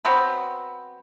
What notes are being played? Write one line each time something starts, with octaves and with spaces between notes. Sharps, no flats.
F#3 B3 C4 B4